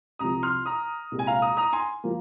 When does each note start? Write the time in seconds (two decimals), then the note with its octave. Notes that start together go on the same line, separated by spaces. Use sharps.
0.19 C2 C3 F3 A#5 D#6
0.43 C6 F6
0.66 A#5 D#6
1.12 C2 A#2 G#3
1.19 G#5
1.27 F5 A#5
1.42 A#5 D#6
1.57 A#5 D#6
1.73 G#5 C6
2.04 F3 A#3